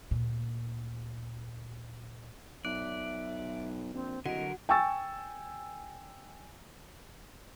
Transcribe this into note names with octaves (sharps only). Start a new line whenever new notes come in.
D2 A#2
B1 D5 E5 F#6
A#1 C4
C2 D3 F#3 F#4 A#4 D#5 F#5
G5 G#5 C#6 E6 A6